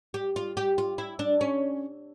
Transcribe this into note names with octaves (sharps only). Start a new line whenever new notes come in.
G4
F4
G4
F4
E4
D4
C#4